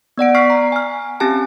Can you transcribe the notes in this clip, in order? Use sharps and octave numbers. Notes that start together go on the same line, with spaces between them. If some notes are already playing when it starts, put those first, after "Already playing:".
B3 D5 F#5 D7
C#6 F6 B6 C7
A#5
G#5 F6
C4 C#4 G4 G#5 A5